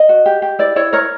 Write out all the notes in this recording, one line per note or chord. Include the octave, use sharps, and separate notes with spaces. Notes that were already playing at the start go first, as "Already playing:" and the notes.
Already playing: D#5
F#4
G4
G4
E4 D5
E4 C#5
A#4 C#5